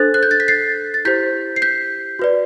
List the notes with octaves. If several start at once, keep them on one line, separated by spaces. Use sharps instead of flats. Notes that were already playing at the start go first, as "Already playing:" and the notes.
Already playing: D4 A4 C5 F#6 A6
F#6
G6
A6
B6
A6 C7
A6
E4 G4 C5 G6 B6
C7
G6 B6
F#4 B4 D5